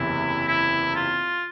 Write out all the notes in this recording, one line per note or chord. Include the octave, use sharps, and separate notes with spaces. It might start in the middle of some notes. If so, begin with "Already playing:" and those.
Already playing: F#1 E2 C3 E3 E4
E4
F4